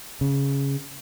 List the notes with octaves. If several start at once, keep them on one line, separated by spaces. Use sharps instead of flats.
C#3